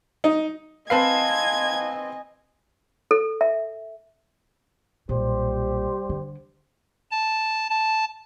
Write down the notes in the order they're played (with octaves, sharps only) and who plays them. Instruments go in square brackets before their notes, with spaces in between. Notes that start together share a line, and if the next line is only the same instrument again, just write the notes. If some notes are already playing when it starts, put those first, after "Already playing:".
[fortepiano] D#4
[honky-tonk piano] C4 B4 C7 [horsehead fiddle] D#5 G#5 [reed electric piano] F5 A5 [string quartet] G#6
[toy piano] A4
E5
[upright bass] B1 A#2 [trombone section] G3 G4 C5
[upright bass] D3
[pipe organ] A5
A5